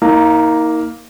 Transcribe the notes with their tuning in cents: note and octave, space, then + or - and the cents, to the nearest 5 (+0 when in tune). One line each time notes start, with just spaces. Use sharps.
A#3 +0 D#4 +40